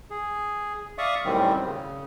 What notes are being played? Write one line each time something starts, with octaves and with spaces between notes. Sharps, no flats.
G#4
D5 E5 F5 C#6 D#6
F#2 A2 D#3 G3 C4
C#3